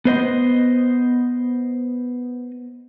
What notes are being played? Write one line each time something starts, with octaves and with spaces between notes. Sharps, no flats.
B3 C5 D#5